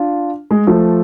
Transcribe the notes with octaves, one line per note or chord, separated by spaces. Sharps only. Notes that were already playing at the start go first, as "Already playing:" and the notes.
Already playing: D4 F4
G#3
F3 A3